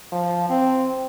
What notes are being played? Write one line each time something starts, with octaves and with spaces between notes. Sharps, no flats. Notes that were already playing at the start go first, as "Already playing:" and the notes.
F3
C4